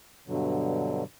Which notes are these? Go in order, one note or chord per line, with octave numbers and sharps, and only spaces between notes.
G2 B2 D3 F#3